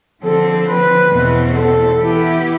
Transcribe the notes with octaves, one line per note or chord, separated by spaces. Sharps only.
D3 F3 C4 A4
B4
E2 B2 A3 C4
A4
E3 B3 E4 G4